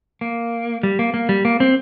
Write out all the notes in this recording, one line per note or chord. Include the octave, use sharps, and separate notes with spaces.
A#3
G3
A#3
A#3
G3
A#3
C4